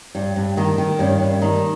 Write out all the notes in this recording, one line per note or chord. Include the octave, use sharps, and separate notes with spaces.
G2
G2
D#3 D#4
D#3
G2 C#4
G2
D#3 D#4